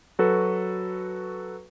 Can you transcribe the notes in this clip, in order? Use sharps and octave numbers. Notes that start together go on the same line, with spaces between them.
F#3 F#4 A4 B4